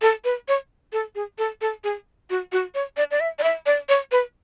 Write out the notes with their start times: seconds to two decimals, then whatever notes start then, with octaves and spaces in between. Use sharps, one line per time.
0.02 A4
0.24 B4
0.48 C#5
0.93 A4
1.15 G#4
1.38 A4
1.61 A4
1.84 G#4
2.30 F#4
2.52 F#4
2.75 C#5
2.97 D5
3.11 D5
3.20 E5
3.39 D5
3.43 E5
3.66 D5
3.89 C#5
4.12 B4